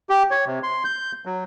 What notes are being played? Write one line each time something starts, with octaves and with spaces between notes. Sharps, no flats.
G4
C#5
C3
C6
G6
F#3